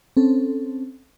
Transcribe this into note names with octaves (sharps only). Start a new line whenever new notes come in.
C4 C#4 A4